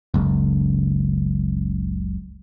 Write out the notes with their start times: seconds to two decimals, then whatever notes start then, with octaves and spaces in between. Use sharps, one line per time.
0.14 F#1 C#2